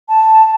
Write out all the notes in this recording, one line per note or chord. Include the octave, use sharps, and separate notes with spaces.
A5